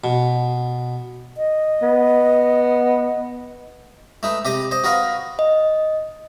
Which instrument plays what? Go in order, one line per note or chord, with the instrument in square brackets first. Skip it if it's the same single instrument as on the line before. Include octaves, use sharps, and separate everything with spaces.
[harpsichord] B2
[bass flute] D#5
[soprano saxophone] B3
[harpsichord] A3 D#4 B4
C3 G4 D#5 D#6
C5 D#5
F#4 A#4 B4 D#5 F5
[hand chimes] D#5